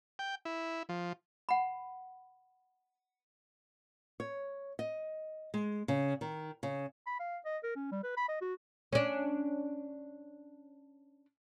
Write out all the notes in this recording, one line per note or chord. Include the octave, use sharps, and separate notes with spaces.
G5
E4
F3
F#5 B5
C#5
D#5
G#3
C#3
D#3
C#3
B5
F5
D#5
A#4
C#4
G3
B4
B5
D#5
F#4
C#4 D4